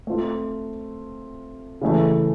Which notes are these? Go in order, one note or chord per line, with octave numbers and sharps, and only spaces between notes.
A3 C4 F4
C#3 E3 A3